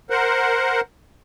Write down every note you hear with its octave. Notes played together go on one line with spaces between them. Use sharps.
A#4 C5 F#5